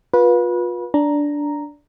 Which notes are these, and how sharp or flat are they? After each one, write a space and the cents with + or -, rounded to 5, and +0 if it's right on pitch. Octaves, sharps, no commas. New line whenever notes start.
F4 +30 B4 -25
D4 -10 A#5 +0